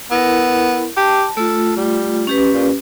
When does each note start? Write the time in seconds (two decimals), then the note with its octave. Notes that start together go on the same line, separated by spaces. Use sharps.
0.11 B3 E4 A#4
0.97 G4 A5
1.37 A3 F4 A4
1.77 G3
2.27 C#4 G4 B4
2.53 A#2